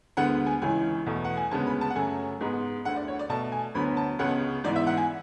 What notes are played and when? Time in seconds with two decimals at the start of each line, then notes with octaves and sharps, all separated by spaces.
0.17 D2 D3 G#3 B3 F#5
0.46 G#5
0.62 C#2 C#3 E3 G#5
1.06 E2 B2 A3
1.24 F#5
1.37 G#5
1.51 D2 C#3 G#3 B3 A5
1.66 B5
1.81 A5
1.90 F#5
1.96 F#2 C#3 F#3 A3 G#5
2.40 G#2 G#3 B3
2.85 D2 D3 A3 F#5
2.96 D5
3.08 C#5
3.19 D5
3.29 B2 A3 A5
3.52 G#5
3.74 D2 D3 F#3 B3 B5
3.97 A5
4.19 C#2 C#3 G#3 B3 F#5
4.64 G#2 E3 B3 D5
4.76 E5
4.87 F#5
4.97 G#5